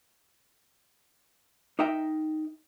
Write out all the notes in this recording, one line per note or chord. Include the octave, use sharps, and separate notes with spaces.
D#4 A#4 D#5 E5 G5